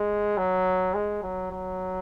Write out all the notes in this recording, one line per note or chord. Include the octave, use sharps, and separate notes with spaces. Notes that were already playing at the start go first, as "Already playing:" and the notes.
Already playing: G#3
F#3
G#3
F#3
F#3